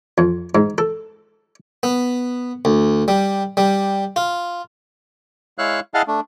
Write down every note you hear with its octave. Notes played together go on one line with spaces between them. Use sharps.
F2
G#2
A4
B3
D2
G3
G3
F4
G#3 E4 C#5 F5 E6 F#6
E4 G#4 D#5 F5 F#5 A5
A3 D4